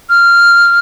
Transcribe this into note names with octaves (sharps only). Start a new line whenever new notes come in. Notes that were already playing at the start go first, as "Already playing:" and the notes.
F6